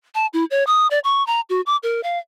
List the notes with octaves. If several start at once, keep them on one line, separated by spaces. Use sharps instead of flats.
A5
E4
C#5
D#6
D5
C#6
A#5
F#4
D6
A#4
F5